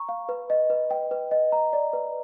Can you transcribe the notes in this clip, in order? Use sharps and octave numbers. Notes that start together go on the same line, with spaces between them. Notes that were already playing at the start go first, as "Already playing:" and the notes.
Already playing: A#5 C#6
F5
B4
D#5
B4
G5
B4
D#5
A#5
D5
B4